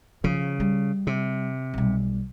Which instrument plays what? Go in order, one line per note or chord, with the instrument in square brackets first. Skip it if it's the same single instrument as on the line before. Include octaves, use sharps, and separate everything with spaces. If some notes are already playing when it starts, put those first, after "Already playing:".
[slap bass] C#3 [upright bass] F3
[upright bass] G3
[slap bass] C3
[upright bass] B1 G3